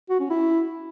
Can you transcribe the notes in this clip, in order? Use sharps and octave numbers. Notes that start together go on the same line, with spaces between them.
F#4
C#4
E4